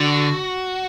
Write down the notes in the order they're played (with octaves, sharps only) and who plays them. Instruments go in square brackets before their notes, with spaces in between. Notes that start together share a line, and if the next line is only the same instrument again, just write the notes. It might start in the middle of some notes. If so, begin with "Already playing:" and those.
Already playing: [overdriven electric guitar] D3 [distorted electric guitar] F#4